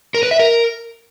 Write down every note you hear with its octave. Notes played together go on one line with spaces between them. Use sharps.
A#4
B4
E5
A#4